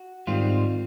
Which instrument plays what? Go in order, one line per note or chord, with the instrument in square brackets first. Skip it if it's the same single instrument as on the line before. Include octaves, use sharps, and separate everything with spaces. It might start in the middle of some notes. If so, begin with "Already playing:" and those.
Already playing: [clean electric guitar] F#4
G#2 D#3 G3 C4 F4